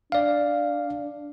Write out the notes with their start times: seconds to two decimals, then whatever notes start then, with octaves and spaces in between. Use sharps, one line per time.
0.12 D4 D5 F5